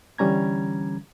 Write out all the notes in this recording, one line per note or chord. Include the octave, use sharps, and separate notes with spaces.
D3 E3 G3 C#4 A#5 G#6